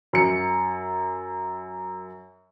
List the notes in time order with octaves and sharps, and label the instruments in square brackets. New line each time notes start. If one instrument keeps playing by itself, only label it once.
[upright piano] F#2 C#7